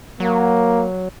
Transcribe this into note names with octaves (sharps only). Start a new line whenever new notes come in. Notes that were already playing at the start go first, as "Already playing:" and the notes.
F#3 A#3